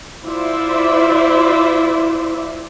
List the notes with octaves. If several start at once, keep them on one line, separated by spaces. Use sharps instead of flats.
E4 F4 C5 D5 E5